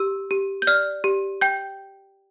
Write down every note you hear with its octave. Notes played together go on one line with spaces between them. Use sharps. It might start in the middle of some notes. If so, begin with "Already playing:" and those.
Already playing: G4 E6
G4
G6
D5 F6
G4
G5 G6